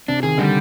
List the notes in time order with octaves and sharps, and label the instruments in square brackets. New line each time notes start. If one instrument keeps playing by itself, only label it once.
[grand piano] C3 [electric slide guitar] D4
[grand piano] D#3 [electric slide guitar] G#4
[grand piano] D3 [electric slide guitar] G3